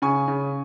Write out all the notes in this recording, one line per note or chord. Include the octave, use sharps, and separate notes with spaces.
C#3 G#5 C#6
C#3